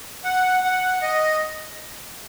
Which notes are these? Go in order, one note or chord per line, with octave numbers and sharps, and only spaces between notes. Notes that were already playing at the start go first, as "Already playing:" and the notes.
F#5
F#5
D#5